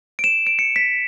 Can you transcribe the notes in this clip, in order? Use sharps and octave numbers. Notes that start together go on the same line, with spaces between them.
D7
E7
D7
C#7
B6